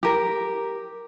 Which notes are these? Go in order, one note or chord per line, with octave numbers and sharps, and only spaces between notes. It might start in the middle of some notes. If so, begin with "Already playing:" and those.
G4 A#4